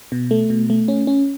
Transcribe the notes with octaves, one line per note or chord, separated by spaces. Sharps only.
B2
A3
B2
A3
C#4
C#4